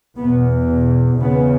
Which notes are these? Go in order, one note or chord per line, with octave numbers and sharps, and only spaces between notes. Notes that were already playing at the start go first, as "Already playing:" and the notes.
E2 B2 B3
E2 C#3 B3